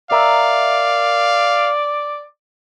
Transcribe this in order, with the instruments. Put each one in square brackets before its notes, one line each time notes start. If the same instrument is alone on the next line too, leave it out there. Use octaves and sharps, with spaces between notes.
[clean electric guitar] A#4 E5 [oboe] D5 [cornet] F5